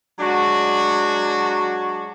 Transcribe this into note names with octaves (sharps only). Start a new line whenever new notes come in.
F#3 G#3 D4 F#4